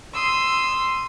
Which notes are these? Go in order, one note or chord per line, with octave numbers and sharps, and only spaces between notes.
C6 D#6 E6